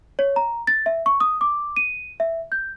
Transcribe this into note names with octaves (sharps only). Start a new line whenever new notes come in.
C#5
A#5
A6
E5
C#6
D#6
D6
D#7
E5
G6